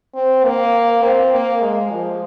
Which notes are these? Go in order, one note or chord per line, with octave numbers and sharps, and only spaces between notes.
C4
A#3
C4
A#3
G#3
F3